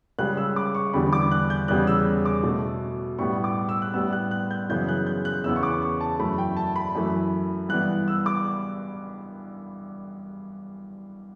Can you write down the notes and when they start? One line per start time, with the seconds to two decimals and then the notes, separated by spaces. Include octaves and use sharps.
0.19 C#2 C#3 G3 F#6
0.37 E6
0.56 D6
0.75 C#6
0.93 E2 D3 G3 B3 B5
1.13 D6
1.31 F#6
1.50 G6
1.68 E2 C#3 G3 B3 F#6
1.87 E6
2.25 D6
2.44 B2 A3
3.19 A2 G3 B3 C#6
3.44 D6
3.69 E6
3.82 F#6
3.94 A2 G3 B3 E6
4.13 F#6
4.31 F#6
4.51 G6
4.69 F#2 C#3 E3 B3 G6
4.89 F#6
5.06 G6
5.25 F#6
5.44 E2 C#3 E3 B3 E6
5.56 C#6
5.63 D6
5.82 C#6
6.01 A5
6.19 F#2 E3 A3 B5
6.38 G5
6.57 A5
6.76 B5
6.95 F#2 E3 A3
7.69 G2 E3 B3 F#6
8.08 E6
8.26 D6